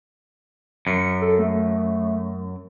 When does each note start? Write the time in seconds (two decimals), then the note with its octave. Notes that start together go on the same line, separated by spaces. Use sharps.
0.87 F#2 C#7
1.21 A4
1.39 A3